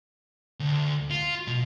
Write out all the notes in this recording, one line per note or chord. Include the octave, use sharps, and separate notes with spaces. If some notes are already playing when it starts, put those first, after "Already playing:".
D2
F4
B2